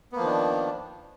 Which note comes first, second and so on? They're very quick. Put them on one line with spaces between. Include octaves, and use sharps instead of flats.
B3 A#3 F3 D#3 D4